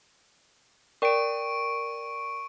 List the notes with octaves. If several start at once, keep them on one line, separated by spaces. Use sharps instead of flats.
A#4 D5 G5 C#6 D7